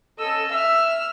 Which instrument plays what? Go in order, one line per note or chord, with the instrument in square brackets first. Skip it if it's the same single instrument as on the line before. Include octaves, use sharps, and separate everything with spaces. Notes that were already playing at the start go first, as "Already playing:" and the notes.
[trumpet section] C#4 A4 [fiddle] D#5 E6
[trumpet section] E5 [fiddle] E6 F6